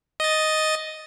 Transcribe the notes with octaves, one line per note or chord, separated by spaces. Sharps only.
D#5 A6